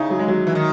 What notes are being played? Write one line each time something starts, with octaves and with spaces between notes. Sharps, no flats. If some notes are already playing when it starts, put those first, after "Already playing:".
Already playing: C#3 D#4 E4
F#3
G#3
F#3
E3
D#3